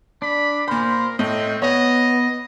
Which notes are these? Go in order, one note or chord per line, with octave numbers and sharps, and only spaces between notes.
D4 B5
A#2 A#4 C5 B5
A2 C4 D#5
B3 C#5 D#5